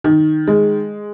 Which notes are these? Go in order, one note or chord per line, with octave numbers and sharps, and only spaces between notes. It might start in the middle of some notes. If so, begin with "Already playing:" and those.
D#3
G#3